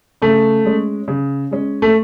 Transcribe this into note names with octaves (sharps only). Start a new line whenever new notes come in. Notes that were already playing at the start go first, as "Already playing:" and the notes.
C#3 A3
G#3 C#4
C#3
G#3 C#4
A3